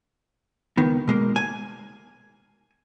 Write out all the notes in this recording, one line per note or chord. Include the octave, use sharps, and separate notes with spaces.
C#2 D#3 B3
B2 G#3 A#3
G#5